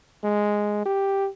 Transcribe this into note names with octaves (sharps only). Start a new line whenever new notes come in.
G#3
G4